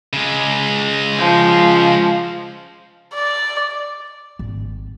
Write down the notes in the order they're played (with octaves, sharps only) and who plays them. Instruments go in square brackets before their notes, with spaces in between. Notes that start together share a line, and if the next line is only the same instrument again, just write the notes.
[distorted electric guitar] C#3 G#3
[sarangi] F3
[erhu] D5
[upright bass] G#1